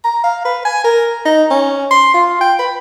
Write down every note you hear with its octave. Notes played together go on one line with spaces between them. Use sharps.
A#5
F5
B4
G#5
A#4
D#4
C#4
C6
F4
G5
B4